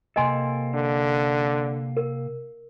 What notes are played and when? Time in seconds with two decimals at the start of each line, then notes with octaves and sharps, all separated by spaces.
0.16 C3 A#3 A4 D#5 G#5 C6
0.74 D3
1.97 A#4